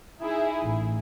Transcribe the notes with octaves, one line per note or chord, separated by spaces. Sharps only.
D#4 E4 G#4
A1